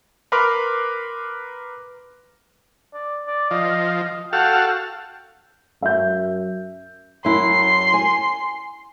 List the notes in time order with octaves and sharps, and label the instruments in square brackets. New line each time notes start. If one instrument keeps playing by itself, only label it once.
[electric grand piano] A#4 B4 B5 C6 D6 F6
[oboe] D5
D5
[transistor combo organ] F3 [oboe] D#5
[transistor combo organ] F#4 A4 F5 [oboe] G5
[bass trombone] F#2 [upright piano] E5 G6
[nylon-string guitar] F#2 E4 [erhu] C6
[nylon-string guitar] G#5